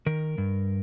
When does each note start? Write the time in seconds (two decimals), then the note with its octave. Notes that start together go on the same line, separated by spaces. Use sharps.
0.06 D#3 A#4
0.38 G2